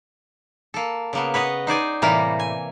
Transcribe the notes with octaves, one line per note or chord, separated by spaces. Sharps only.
A#3 A4
C#3 A#3 B3
B4 C#5 D#5 F#5
D#4 C5 D5 G#5
A2 C3 E3 G3 A#3 A#4
G#5